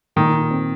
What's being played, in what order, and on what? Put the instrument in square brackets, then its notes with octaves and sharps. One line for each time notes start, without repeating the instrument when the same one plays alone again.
[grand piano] A#2 [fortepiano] D#3
[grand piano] C4